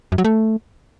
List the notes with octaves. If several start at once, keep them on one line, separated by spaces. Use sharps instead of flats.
F#2
F#3
A3